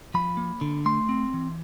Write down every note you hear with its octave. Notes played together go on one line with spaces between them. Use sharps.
F3 B5
A#3
D3
A3 C6
C4
E3